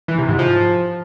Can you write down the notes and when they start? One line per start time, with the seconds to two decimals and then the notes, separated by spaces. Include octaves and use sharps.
0.08 E3
0.18 C3
0.29 G#2
0.39 F3